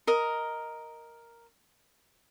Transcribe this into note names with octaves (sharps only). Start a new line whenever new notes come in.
A#4 D#5